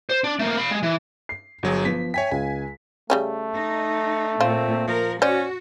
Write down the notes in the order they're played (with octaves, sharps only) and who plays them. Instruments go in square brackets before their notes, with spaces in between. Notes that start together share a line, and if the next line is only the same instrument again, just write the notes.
[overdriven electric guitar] C5
D4
A3 A#3
F5 B5
G#3
E3
[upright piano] C7
[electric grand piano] G1 F#3 G#4 [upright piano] F#4
[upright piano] F3 B3 [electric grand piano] B6
[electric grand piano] C#5 G#5 B6 [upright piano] E5 G5
[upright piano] C#2 [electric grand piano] G#5
[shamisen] C#3 G3 C#4 [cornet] A3
[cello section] D#4
[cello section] A#2 [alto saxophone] C4 [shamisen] F4
[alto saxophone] F3 [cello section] A#4
[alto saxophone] C#4 [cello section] F#4 [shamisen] C5 D5